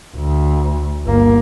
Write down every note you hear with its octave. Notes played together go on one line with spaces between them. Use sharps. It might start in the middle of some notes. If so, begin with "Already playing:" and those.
D2
G1 A#3